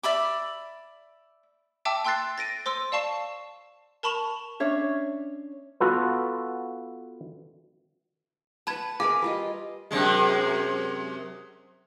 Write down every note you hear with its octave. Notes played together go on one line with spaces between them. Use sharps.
D5 E5 B5 D6
E5 G5 A5 D6 E6
G5 C6 E6 F#6 A6 C7
A6 A#6 D7 D#7
C5 C6 E6
D5 F5 A5 C#6 C7 E7
A#4 A5 B5 C#6 E7 F7
C#4 D4 C#5 E5
B3 F4 F#4 A4 B4
B4 F#5 A5 B5 G#6
G#4 A#4 B4 F5 D6
G3 F4 D#5
F#2 C3 G#3